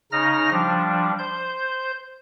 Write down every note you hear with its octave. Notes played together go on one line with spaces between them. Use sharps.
C#3 D#4 F6 A#6
F3 G3 D4
C5 G6